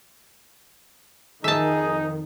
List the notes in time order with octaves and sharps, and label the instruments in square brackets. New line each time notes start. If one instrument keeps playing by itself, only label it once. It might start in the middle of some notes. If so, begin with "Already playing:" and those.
[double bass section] F2 D#3 [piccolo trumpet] D#4 [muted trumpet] G#4 [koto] E5 A5